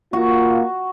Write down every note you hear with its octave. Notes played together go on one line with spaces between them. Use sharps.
A#3 F4 F#4